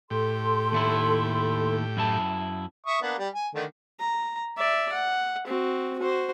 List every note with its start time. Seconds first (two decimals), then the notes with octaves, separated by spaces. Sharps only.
0.10 A2 G4 A4 C6
0.72 D#2 A3 E4
1.97 F#2 E4 A5
2.86 E5 C#6 D#6
3.02 A#3 B3 D4
3.18 G3
3.34 G#5
3.55 D3 D#3 A3
4.00 A#5
4.57 D5 E5
4.93 F#5
5.47 C4 F#4
5.98 F#4 C5